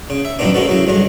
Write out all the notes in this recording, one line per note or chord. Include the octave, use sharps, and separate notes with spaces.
C#3
E5
F#2 A#2 D#3 A#3 B3 D4
G#3 A#3 C#4 F#4 A4 B4
C#3 F#3 E4
G2 D3 F#3 G#3